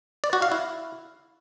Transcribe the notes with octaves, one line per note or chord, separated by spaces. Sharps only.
D5
F#4
F5
E4